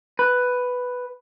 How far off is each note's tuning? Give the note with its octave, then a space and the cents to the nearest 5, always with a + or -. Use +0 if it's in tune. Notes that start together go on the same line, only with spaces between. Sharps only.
B4 +5